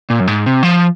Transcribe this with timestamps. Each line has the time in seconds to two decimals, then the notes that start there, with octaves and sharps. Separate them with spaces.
0.10 A#2
0.20 F#2
0.27 G#2
0.46 C3
0.63 F3